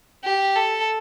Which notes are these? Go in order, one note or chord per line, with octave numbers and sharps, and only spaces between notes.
G4
A4